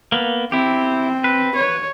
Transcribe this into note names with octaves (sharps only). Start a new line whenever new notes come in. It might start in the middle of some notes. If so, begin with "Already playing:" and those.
A#3 B3
C4 E4 G4
B4
C#5